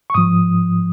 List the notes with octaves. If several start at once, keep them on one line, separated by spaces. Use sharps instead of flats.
C#6
G#2 F3 D#6